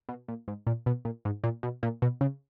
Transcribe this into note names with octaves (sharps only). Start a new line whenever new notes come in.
B2
A#2
G#2
A#2
B2
A#2
G#2
A#2
B2
A#2
B2
C#3